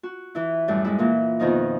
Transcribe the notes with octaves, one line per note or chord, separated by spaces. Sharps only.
F#4
E3 E4
F#2 A2 G3
G#3 E4
A#2 E3 A#3
F2 B2 D#3 F3 D#4